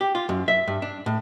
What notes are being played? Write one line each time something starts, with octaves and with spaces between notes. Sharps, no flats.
G4
F4
F#2
E5
G2
D4
A2